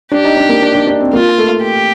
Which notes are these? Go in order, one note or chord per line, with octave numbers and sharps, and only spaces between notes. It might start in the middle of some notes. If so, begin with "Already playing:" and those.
D4 G4
D#4
D4
A#3
D4
D4
D4
C4
A#3 F4
A3
G4